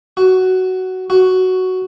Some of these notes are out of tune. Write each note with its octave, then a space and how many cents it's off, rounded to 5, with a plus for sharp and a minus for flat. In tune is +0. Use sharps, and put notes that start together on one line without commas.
F#4 +10
F#4 +5